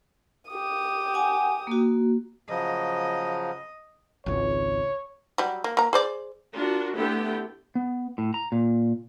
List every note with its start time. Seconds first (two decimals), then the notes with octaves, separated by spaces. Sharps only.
0.50 G4 D#6
1.14 F#5 G#5
1.67 A#3 F#4
2.49 C#3 F3 F#3 D#5
4.26 G#1 C#2 C#5
5.38 F#3 G3
5.64 A#3
5.77 A#3 A#5
5.93 G#4 C5 D5
6.55 D4 F4 F#4 A#4
6.96 D3 A3 B3 E4 G4 G5
7.75 B3
8.18 A2
8.34 A#5
8.52 A#2